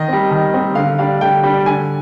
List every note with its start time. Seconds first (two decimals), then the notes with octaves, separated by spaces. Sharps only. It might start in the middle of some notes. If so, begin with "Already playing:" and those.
Already playing: D#3 D#5
0.08 G3 C4
0.31 D#3
0.54 G3 C4
0.75 D3 F5
0.98 G3 D4 F5
1.21 D3 G5
1.43 G3 D4
1.66 D3 G#5